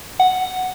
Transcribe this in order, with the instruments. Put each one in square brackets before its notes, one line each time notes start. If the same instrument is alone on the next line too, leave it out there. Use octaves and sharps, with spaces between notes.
[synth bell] F#5